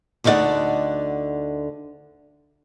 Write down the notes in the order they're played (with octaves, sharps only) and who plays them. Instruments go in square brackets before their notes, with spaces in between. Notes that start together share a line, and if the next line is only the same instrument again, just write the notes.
[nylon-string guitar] D2 D3 D#4 F#4 D5 F#5